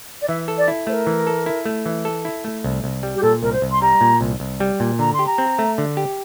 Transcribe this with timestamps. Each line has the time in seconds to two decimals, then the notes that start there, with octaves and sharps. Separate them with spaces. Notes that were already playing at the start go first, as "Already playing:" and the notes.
0.21 D5
0.28 E3 E5
0.48 A4
0.57 D5
0.68 E4
0.87 A3 C5
0.92 A#4
1.07 E3
1.27 A4
1.46 E4
1.66 A3
1.86 E3
2.05 A4
2.25 E4
2.44 A3
2.64 C2
2.84 C2
3.03 G3
3.15 G4
3.22 A#2 A4
3.42 C2 A#4
3.52 C5
3.62 C2
3.71 C6
3.81 G3 A#5
4.01 A#2
4.21 C2
4.40 C2
4.60 G3
4.80 A#2
4.99 D3 A#5
5.13 C6
5.19 G4
5.26 A#5
5.38 C4
5.59 A3
5.78 D3
5.97 G4